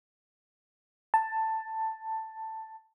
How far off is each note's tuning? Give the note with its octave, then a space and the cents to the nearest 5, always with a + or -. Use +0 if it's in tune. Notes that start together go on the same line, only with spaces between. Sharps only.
A5 +10